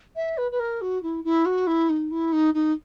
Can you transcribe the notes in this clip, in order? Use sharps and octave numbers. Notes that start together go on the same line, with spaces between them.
E5
B4
B4
A#4
F#4
E4
E4
F#4
E4
D#4
E4
D#4
D#4